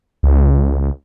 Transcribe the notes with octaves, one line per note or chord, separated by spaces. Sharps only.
C#2